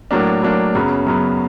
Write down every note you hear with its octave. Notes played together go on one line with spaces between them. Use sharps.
A2 F#3 A#3 D4
A2 F#3 A#3 D4
F#2 C#3 F#3 B3
F#2 C#3 F#3 B3